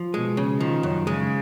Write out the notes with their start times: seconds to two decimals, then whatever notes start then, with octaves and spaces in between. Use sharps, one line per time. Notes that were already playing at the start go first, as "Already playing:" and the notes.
Already playing: F3
0.14 B2 G#3
0.37 C#3
0.60 D#3 F3
0.83 F#2
1.07 C#3 G#3